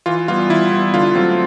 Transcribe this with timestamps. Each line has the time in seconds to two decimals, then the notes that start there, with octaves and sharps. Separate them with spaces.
0.06 E3 F4
0.28 G3 B3 F4
0.49 E3 E4
0.72 G3 B3
0.94 D3 F4
1.15 F#3 A3 C4